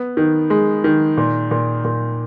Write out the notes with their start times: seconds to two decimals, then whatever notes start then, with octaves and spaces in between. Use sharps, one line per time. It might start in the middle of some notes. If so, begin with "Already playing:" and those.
Already playing: B3
0.17 D#3
0.50 G#3
0.84 D#3
1.17 A#2
1.51 A#2
1.84 A#2